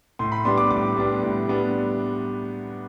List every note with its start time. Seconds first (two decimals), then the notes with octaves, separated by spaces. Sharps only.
0.19 A2 C6
0.32 B5
0.44 G3 B3 D4 C6
0.58 D6
0.70 A2 D6
0.96 G3 B3 D4
1.22 A2
1.48 G3 B3 D4